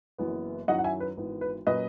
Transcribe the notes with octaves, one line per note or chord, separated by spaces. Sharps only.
F#1 F#2 E3 B3
F#2 D#3 F#3 C#4 E4 D#5 F#5
F#5
E5 G#5
B4
G#1 G#2 E3 B3
B4
A#2 F#3 C#4 B4 D#5